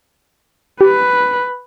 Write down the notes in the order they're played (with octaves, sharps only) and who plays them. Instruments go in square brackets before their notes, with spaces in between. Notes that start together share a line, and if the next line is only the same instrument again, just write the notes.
[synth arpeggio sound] G4 [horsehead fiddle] B4